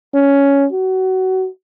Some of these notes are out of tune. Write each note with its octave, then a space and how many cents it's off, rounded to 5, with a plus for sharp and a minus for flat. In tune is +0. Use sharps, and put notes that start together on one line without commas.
C#4 +10
F#4 +25